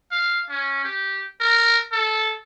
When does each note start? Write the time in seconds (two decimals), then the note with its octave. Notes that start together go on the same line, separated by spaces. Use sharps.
0.11 F5
0.49 C#4
0.84 G4
1.40 A#4
1.92 A4